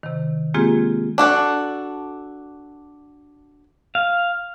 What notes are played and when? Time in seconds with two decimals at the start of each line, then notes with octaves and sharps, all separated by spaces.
0.03 C3 D#3
0.54 G#3 A#3 C4 F4 G4 G#4
1.18 D4 F#4 A4
3.95 F5